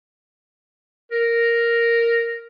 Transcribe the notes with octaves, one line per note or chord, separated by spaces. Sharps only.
A#4